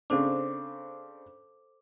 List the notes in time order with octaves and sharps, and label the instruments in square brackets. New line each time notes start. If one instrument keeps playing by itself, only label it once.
[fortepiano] C#3 C4 D4 [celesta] A4 C5 D6